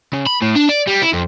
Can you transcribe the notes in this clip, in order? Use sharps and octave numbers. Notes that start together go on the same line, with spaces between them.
C#3
B5
A2
D4
D5
G3
E4
F2